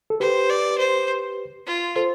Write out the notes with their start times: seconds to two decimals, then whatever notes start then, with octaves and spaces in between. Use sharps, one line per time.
0.10 A4
0.20 G4 B4 C5
0.50 D5
0.78 C5
1.66 F4
1.96 A4 C5